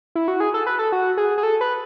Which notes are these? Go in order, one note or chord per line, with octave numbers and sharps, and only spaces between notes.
E4
F#4
G#4
A4
B4
A4
F#4
G#4
G#4
A4
B4